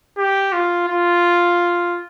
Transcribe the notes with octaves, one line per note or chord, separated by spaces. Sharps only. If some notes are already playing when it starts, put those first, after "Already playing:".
G4
F4
F4